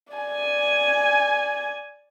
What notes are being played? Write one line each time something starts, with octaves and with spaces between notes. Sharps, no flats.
D5 G#5